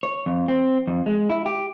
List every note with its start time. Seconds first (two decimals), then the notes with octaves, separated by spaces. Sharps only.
0.03 C#5
0.26 F2
0.48 C4
0.87 F2
1.06 G#3
1.30 E4
1.46 G4